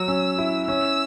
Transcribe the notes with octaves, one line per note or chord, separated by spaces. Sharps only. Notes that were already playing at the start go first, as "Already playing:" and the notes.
Already playing: F#3 E6
C#4
E4
C#4 E6